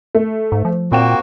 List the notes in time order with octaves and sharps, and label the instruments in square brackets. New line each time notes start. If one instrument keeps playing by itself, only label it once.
[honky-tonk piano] A3
[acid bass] G#2
F3
[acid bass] A#2 [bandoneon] A#3 F#4 [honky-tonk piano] C4 G5 E7